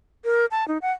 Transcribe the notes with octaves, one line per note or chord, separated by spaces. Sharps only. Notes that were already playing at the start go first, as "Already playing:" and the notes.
A#4
A5
D#4
F#5